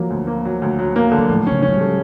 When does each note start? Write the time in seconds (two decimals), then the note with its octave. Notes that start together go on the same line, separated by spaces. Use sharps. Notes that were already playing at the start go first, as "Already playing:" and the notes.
Already playing: F3 F#3 A#3
0.10 D2
0.27 A#3
0.45 F#3
0.62 D2
0.79 F#3
0.96 A#3
1.12 D3
1.18 F#3
1.29 A2 F3
1.47 C#3 C#4
1.62 C#4
1.68 F#3
1.74 G3
1.80 A3